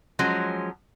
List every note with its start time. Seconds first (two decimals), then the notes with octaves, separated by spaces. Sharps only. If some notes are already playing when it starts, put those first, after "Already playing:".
0.19 F3 F#3 G#3 C#4